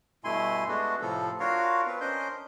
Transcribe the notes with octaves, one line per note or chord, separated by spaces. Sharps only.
G2 B2 A3 E4 G#5 C6
G#3 A3 B3 D4 F#4
A2 C3 F3 A4
D4 F4 F#4 A#4 C#5 F5
B3 C4 B4
C#4 D4 A#4 C5 D#5 G6